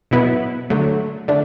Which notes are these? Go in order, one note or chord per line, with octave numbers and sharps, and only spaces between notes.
B2 F#3 B3 E4
D3 F#3 A3
D3 A3 D4